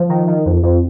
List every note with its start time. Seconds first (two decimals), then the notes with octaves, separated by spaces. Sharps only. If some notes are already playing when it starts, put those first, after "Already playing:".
Already playing: F3
0.09 D#3
0.27 D#3
0.45 F2
0.63 F2